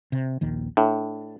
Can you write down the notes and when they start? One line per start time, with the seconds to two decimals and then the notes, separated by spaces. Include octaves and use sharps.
0.12 C3
0.41 A#1 D#2 D#3
0.77 A2 D4